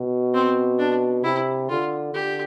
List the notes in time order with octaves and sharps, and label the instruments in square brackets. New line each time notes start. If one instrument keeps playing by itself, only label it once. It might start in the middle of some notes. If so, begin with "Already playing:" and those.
Already playing: [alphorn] B2
[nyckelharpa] C4
D4
[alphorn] C3 [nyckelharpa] E4
[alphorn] D3 [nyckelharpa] F4
[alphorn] D3 [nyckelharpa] G4